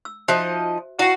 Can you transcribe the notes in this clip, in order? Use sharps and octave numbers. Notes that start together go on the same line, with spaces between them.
E6
F3 D#4 F#4 C5 D#5 E5
E4 F#4 F5 F#5